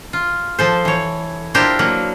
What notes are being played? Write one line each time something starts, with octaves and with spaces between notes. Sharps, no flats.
F4
F3 A4 C5
E3 C#5
D4 E4 F4 G4 A#4 C5
F#3 A#3